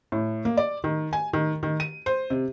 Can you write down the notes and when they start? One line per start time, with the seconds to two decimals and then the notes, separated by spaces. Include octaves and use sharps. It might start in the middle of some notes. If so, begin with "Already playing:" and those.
0.12 A2
0.45 A#3
0.57 D5
0.84 D#3
1.13 G#5
1.33 D#3
1.63 D#3
1.80 D#7
2.06 C5
2.30 C3